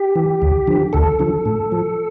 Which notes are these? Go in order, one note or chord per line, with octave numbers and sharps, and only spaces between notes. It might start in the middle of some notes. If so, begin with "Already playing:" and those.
Already playing: G4
E3
D2
D3 F3
D2 A4
D3 F3
A2
F3